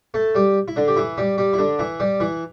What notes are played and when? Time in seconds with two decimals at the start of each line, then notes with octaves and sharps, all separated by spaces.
0.14 A3 A4
0.35 G3 G4
0.68 E4
0.76 D3 D4
0.88 G4
0.96 E3 E4
1.18 G3 G4
1.38 G3 G4
1.53 E4
1.58 D3 D4
1.79 E3 E4
2.00 G3 G4
2.20 E3 E4